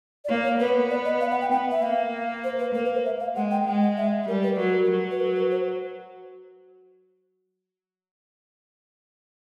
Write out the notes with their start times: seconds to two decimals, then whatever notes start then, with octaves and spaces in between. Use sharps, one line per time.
0.25 D5
0.29 A#3 C#5
0.44 C#5
0.60 B3 B4
0.90 D5
1.05 D#5
1.21 F5
1.31 F#5
1.41 G5
1.51 B3 G5
1.71 E5
1.83 A#3 F5
2.44 C5
2.59 B4
2.74 A#3 A#4
2.85 B4
2.95 C5
3.06 E5
3.20 F5
3.35 G#3 F#5
3.51 G5
3.67 G#3 G5
3.82 F#5
3.97 E5
4.28 G3 A#4
4.43 B4
4.59 F#3 A#4
4.90 F#3
5.11 B4
5.20 A#4
5.35 B4
5.51 C5